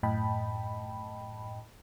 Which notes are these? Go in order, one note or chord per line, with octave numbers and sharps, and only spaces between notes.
F#2 A2 D#5 G5 A5 B5